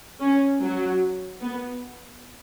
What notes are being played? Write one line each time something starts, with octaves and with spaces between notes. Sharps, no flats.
C#4
F#3
B3